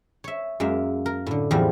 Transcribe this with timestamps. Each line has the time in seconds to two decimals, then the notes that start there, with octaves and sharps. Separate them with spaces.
0.24 C#5 E5
0.60 F#2 G#3 A#3 E5
1.06 A#4
1.26 A2 D3
1.51 E2 A2 F3 G3 C4